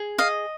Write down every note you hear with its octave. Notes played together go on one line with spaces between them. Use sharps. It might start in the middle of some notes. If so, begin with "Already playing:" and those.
Already playing: G#4
D#5 F5